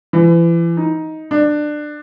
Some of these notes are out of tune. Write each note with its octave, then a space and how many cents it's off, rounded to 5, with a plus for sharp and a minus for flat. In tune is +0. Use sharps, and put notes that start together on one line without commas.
E3 +35
D#4 +15
D4 +20